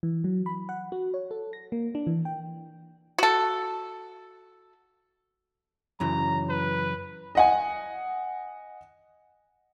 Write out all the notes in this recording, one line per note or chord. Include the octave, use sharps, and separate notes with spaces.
E3
F#3
B5
F#5
F#4
C#5
A4
A#6
A#3
D4
E3
G5
F#4 A4
F#2 C#3 E3 A#5
B4
D#5 F#5 G#5